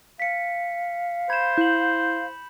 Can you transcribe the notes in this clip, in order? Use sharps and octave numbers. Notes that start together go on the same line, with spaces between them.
F5 B6 C#7
C5 B5 G#6 E7
E4 G6 F#7